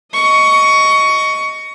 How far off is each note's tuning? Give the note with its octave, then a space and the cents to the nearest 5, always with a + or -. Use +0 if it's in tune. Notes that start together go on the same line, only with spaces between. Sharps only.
D#5 +0 C#6 +15